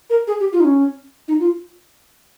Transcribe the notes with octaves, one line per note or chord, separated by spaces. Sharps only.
A#4
G#4
G4
F4
D#4
C#4
D#4
F4